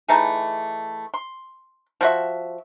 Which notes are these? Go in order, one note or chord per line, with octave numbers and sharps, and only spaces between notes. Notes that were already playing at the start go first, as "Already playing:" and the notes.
E3 A3 D#4 G#4
C6
F3 F#4 E5